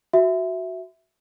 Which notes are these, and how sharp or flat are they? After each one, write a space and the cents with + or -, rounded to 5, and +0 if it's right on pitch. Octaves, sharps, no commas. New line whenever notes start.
F#4 +0 E5 +0